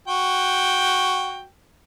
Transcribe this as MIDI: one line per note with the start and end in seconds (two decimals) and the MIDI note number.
0.08 1.46 66
0.08 1.46 79